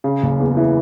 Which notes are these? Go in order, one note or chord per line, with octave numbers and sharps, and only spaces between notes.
C#3
F#1
E2
E3